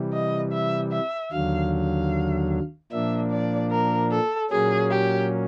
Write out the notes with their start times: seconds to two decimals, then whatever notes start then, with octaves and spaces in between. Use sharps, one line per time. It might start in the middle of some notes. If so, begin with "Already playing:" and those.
Already playing: C3 E3 G3
0.13 D#5
0.52 E5
0.92 E5
1.32 D#2 D3 F#3 F5
1.72 F5
2.92 A#2 F3 A#3 D4 E5
3.31 D5
3.71 A#4
4.11 A4
4.50 A#2 F#3 A#3 C#4 G#4
4.91 G4